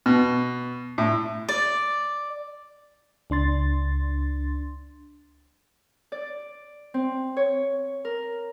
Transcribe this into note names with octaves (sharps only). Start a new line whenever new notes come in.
B2
A2
D5
C#2 D4 C6 A6
D5
C4
C#5
A#4